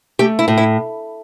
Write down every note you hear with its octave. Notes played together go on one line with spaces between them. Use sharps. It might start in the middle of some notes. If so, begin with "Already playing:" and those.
A3 G4
E4
A2
E4